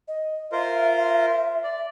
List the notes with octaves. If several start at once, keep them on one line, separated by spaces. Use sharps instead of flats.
D#5
F4 A#4 C5 E5
D5